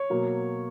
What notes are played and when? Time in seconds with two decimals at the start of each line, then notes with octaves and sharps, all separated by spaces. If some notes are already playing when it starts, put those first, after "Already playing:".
Already playing: C#5
0.10 B2 F#3 A#3